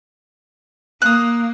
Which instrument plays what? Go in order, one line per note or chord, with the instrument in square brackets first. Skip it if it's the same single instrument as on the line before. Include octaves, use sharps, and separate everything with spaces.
[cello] A#3 [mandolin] D#6 F#6